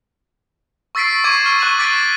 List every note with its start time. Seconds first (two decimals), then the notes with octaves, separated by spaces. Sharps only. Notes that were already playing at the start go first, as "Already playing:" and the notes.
0.95 C#6 E6 A6 B6 C7 D7
1.24 C#6 D6 G#6 D#7
1.46 F6 D7
1.60 C#6 F#6 D#7 F#7
1.79 D6 A6 B6 D7 D#7